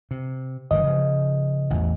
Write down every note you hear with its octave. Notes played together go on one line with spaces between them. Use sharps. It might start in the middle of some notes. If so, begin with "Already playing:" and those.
C3
G1 D#3 E3 D#5
C#3 F3
A1 E2